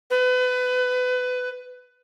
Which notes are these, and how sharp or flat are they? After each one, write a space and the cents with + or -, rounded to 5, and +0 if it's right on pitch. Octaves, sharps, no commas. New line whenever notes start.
B4 +25